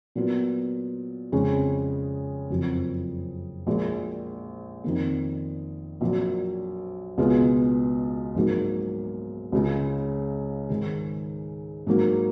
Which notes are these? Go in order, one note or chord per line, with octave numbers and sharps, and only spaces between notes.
A#2 F#3 B3 F4
F2 C#3 G#3 C#4
F#1 F2 F3
A#1 A#2 G#3
F2 D#3 A#3
A#1 A#2 F#3
C#2 B2 G#3 B3 F4
A#1 G#2 F#3 A#3
C#2 C#3 G#3
G#2 D#3 G#3
G#2 F#3 A#3